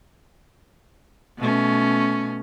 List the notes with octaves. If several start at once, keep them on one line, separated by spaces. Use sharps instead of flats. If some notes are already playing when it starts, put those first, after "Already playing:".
B2 A3 C#4